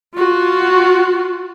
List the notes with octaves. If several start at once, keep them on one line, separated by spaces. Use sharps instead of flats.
F4 F#4